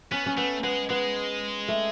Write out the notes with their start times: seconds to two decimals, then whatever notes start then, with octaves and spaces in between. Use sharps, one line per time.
0.12 B3 C#4
0.26 C#4
0.38 A3 B3
0.63 G#3 B3
0.90 G#3 B3
1.68 A3